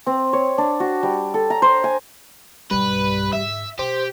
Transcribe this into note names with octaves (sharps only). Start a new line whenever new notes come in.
C4
C#5
D4
F#4
G3
A4
A#5
C5
G#5
B1 G2 G3 B4
G#2 D3 E5
B2 G4 C5